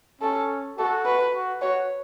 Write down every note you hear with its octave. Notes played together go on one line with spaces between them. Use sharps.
C#4 A4
F#4 A4
B4
F#4
F#4 C#5